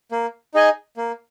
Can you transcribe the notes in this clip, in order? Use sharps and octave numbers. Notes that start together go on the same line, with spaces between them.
A#3
D#4 G#4 D#5 G#5
A#3